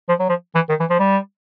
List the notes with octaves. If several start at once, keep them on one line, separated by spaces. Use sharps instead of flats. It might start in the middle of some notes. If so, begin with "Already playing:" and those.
F3
F#3
F3
E3
D#3
E3
F3
G3